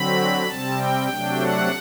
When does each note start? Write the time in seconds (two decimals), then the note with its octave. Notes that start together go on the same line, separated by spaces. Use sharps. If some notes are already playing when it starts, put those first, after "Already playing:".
Already playing: D3 F#3 C4 B5
0.47 C3 G3 C4 A5
0.78 G5
1.09 C3 F#3 A3 D4
1.41 F#5